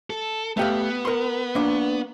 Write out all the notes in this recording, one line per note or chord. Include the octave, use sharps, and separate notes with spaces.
A4
A3 B3 G4 F5
A#4 C6
A#3 D4